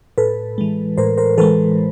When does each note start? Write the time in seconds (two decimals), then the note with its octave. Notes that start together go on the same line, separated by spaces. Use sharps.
0.18 A2 A4 B4
0.58 E3 G#3
0.98 A2 A#4 C5
1.18 A#4 C5
1.38 E3 G#3 A4 B4